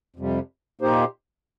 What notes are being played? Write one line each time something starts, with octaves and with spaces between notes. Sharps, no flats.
F2 C3 G3
A#2 A#3 D#4 G4 C5